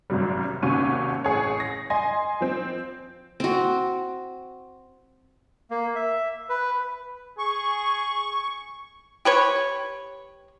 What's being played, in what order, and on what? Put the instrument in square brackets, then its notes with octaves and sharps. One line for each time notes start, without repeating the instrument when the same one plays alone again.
[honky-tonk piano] G#1 F#2 C3 F#3 G3
G#1 D#2 C3 C#4 F#4 D#7
A1 G#4 C#5
A#6
D#5 G#5 C6 A#6
F3 C4
[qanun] C4 F#4
[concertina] A#3
E5
B4
[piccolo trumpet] G#4 [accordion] C#6
[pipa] G4 B4 C#5